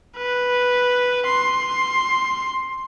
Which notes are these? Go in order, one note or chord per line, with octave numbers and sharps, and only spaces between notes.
B4
C6